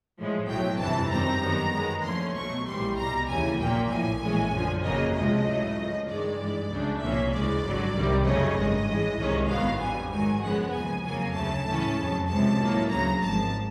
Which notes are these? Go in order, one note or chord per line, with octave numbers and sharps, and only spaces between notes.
A2 F3 G#3
B1 A2 F#3 G5
G1 F2 C3 E3 A5
G1 F#2 D#3 G3 C4 A#5
F#2 D#3 G3 B3
F#2 D#3 G#3 B3
D#2 D3 F3 A3 C#4 C6
B1 B2 F#3 A3 C#6
A#1 G#2 E3 G3 C6
C2 B2 G3 A#5
D#2 C#3 E3 G#5
A#1 A#2 F#3 A#3 G5
A#1 A2 F3 G#5
A#1 A2 E3 G#3 C#4
F#2 D3 F3
G1 F2 C#3 F#3 A#3 D#5
C#2 C3 F3 G#3 D#5
A2 F#3 A3
C#2 C#3 F3
G2 D#3 G#3 D5
G2 E3 G#3
C#2 C#3 F#3 A3 D4
C2 A#2 F3 A#3 C#4 E5
D2 C#3 E3 G#3 D5
G#1 G2 D3 F#3
C2 C3 D#3 G3 A#3
F#2 C#3 F#3 A3 C#4 D#5
G#1 G2 D#3 G#3
A2 E3 G#3
C2 C3 D#3 G#3 C#4
A1 G#2 D#3 F#3 B3 F5
F2 D3 G3 G#5
G#2 D#3 F#3 G#5
F#2 C#3 F3 G#3 B3 F#5
D#2 C#3 F3 G#5
F2 C#3 F#3 A#3 C#4 G#5
D2 C#3 F#3 A3 A5
A2 E3 A3 C#4
F2 C#3 F#3
C#2 C3 F3 A5
A2 F#3 A#3
D2 C#3 F#3 A#5
G#1 G#2 F3 A5